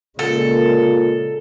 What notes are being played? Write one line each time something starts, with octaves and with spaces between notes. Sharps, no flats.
A#2 C#3 G#3 A4